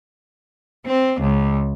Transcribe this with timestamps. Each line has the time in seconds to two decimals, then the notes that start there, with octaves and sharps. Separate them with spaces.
0.86 C4
1.21 C#2